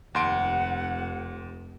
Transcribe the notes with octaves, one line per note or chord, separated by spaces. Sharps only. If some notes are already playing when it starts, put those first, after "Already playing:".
F1 D#2 F#5 C6 D7